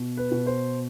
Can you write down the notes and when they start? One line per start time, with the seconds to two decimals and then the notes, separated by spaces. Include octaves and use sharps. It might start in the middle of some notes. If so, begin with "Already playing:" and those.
Already playing: B2
0.17 B4
0.31 B2
0.47 C5